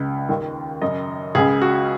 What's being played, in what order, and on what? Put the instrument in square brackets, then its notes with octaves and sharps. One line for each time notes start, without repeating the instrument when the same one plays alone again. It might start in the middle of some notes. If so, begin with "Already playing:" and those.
Already playing: [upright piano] C#2 C#3
D#2 D#3
F#2 C#3 D#5
C#2 C#3 G#4
F#4